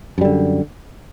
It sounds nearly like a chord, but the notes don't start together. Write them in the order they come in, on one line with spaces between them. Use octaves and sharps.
F#2 G3 D3